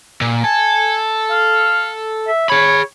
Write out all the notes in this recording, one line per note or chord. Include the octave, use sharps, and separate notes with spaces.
A#2
A4 G#5
F5
E5
G#4 C#5 B5